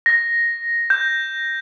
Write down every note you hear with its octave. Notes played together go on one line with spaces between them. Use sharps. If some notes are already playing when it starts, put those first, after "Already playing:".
A#6
G6